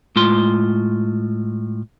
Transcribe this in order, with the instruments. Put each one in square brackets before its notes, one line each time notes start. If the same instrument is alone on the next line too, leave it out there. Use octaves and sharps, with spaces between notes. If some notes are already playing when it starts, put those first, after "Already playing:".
[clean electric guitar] A2 G#3 F4 C6